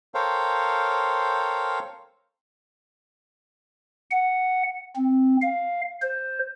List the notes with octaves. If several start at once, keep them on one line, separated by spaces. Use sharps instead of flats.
A4 A#4 C5 C#5 F5 G5
F#5
C4
F5
C5